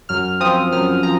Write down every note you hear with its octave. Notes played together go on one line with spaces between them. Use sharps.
F#2 F6
F3 C4 D#6
F#2 F6
F3 A#5